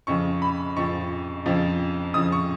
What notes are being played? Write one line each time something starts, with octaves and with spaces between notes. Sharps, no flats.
F2 C#3 F3 C#6
B5
F2 C#3 F3 C#6
F2 C#3 F3
F2 C#3 F3 D#6
C#6